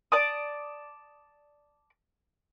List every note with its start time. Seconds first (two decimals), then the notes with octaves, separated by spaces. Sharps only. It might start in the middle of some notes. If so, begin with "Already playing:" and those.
0.12 D5 A5 D#6